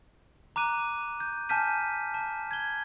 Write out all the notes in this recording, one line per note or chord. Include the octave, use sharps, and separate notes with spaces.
A#5 D6 F#6 D#7
G6
G#5 A5 F6 G6 B6 D#7
A5
G#6 G7